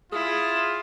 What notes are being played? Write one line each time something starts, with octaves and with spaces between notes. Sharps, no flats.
E4 F4 G#4